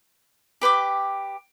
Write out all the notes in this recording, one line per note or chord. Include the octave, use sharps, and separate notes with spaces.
G4 B4 G5 D6